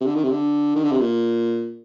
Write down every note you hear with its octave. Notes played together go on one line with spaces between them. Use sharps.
C3
D3
D#3
C3
D3
D#3
D3
C3
A#2